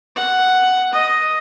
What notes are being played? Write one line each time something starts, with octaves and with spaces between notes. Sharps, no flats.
F#5
D#5